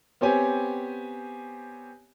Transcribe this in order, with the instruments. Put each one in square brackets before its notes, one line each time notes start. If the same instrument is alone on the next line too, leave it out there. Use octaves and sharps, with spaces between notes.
[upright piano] B3 C4 G4 C#5 G#5